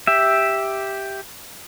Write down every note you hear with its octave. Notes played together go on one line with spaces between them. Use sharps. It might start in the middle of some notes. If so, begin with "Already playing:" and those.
G4 E5